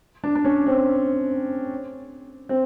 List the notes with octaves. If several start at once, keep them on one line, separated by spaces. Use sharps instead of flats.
D4
D4
C#4
C4
C4